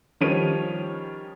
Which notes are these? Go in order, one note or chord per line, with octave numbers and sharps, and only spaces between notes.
D#3 F3 G3 C#4 C#5 D#7